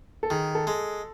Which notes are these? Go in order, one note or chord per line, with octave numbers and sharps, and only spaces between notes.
A4
D#3 G#4
A4
G#3